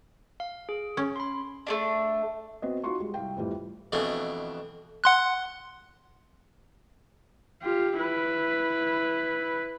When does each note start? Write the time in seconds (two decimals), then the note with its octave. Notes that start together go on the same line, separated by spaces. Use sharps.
0.40 F5
0.69 G#4
0.97 C#4
1.16 B5 C6
1.67 A3 A#3 D4
2.62 B3 C4 F#4 D#5
2.84 D#4 F4 F#4 F5 C6 C#6
3.00 G3 G#3
3.14 C2 F5 G5
3.36 F2 A2 E3 G3
3.92 F2 B2 E3 A3 D4
5.04 F#5 C6 F#6
7.63 F4 G4
7.98 E4 B4